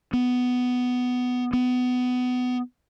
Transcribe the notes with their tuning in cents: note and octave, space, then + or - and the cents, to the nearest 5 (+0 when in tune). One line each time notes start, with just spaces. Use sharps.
B3 +10
B3 +20